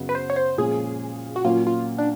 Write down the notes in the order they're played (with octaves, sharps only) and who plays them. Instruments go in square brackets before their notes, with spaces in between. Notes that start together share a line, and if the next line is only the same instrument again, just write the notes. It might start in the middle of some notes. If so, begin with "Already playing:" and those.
Already playing: [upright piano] F#2 C#3 F#3 B3
[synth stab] B4
C5
C#5
C5
[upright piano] A#2 F3 G#3 C#4 [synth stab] G#4
[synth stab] F#4
[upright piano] A#2 F#3 A#3 C#4 [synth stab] F4
[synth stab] F4
D4